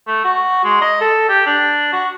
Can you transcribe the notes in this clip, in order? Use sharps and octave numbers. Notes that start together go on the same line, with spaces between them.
A3
F#4
G#3
D#5
A4
G4
D4
F#4